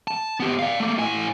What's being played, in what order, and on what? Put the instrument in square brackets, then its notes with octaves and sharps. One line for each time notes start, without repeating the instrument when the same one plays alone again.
[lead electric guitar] A5
B3 G4
D5 F5
A3 A#3
A2 G#5